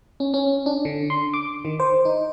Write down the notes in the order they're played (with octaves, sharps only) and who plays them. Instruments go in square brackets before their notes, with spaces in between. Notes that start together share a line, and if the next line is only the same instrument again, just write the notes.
[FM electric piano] C#4
C#4
D4
D3
C6
D6
D#3
C5
D#4